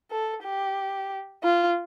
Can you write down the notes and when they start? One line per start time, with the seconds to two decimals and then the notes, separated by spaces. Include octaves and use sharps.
0.11 A4
0.43 G4
1.43 F4